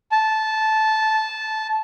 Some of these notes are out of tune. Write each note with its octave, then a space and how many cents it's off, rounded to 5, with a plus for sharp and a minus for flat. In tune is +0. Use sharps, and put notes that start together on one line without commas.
A5 -15